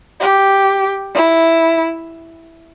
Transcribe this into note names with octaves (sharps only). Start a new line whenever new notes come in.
G4
E4